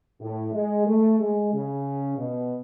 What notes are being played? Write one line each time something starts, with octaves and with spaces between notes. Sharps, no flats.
A2
G#3
A3
G#3
C#3
B2